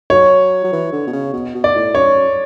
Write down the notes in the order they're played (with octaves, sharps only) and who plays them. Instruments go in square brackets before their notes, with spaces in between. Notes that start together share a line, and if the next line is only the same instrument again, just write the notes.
[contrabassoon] F#3 [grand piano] C#5
[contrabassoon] F#3
E3
D3
B2
C#3
B2
B2
[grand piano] D5
[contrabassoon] A2
[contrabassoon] F#2 [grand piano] C#5